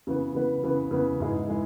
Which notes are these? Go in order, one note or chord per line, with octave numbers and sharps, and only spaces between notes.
C#3 E3 B3
C#3 E3 B3
C#3 E3 B3
C#3 E3 B3
G#2 E3 G#3 E4 G#4
E3 G#3 E4